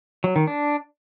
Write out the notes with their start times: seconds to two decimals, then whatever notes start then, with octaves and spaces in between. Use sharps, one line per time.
0.24 F#3
0.36 D#3
0.47 D4